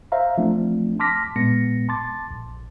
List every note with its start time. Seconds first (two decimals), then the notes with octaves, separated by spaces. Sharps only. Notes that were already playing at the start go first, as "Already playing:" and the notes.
0.12 C5 E5 F5 A#5
0.38 F3 A3 C4 D4
1.00 A5 C6 D6 F6 A#6 B6
1.36 A#2 G#3 B3 A#6 C#7
1.89 A5 C6 D6 A6
2.31 A#1